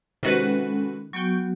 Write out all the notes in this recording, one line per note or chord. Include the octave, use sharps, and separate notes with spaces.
C3 D#3 G#3 C#4 F#4 A4 B4
F#3 B3 F#4 G5 C#6